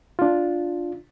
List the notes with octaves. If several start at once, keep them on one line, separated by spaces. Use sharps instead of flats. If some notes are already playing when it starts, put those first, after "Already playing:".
D4 F4